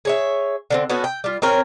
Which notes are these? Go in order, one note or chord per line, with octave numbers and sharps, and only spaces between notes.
G#4 C#5 E5
D3 G3 C4
B3 C#4 F#4 A4
G5
G3 F4
C4 C#4 A#4 C#5